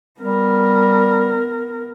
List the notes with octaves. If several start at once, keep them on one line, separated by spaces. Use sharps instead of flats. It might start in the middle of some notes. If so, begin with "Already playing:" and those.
G3 B3 A#4